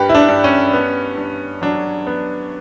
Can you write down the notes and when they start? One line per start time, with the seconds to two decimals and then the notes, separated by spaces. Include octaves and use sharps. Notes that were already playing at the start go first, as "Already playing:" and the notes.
Already playing: G2 A#3 G4 B4
0.09 E4
0.15 D4
0.29 G2
0.44 C#4
0.73 B3
1.17 G2
1.61 F#3 D4
2.07 B3